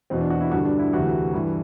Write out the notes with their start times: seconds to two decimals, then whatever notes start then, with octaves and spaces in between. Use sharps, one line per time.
0.10 E2 B2 C4
0.21 D4
0.30 F#4
0.41 E4
0.51 G2 D3 F#4
0.65 D4
0.79 E4
0.93 D2 C3 E3 F#4
1.33 G2 E3